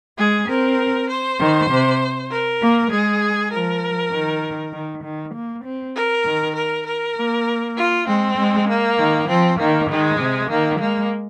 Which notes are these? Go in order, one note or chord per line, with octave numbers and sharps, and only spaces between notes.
G#3 G#4
C4 A#4
C5
D#3
C3
A#4
A#3
G#3 G#4
F3 A#4
D#3
D#3
D#3
A#3
C4
A#4
D#3
A#4
A#4
A#3
F4
G#3 C4
G#3
A#3
D#3
F3 C4
D#3 A#3
D#3 G#3
C3
D#3 A#3
G#3 A#3